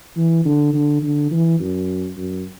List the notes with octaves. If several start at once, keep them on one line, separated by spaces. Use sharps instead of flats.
E3
D3
D3
D3
E3
F#2
F#2